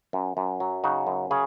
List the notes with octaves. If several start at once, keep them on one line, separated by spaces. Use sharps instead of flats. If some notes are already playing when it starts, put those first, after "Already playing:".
F#2
F#2
F#3
C#3 D#4 F#4
F#2
C#3 G#4